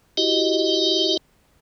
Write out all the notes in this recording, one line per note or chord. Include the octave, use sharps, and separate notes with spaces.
E4 F#4 G4 D#5